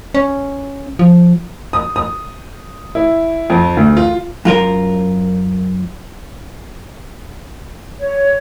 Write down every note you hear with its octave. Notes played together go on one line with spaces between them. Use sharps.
C#4
F3
D#6
D#6
E4
F2
D2
F4
F#2 F4 A#4
C#5